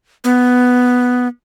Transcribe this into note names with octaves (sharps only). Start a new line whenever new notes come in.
B3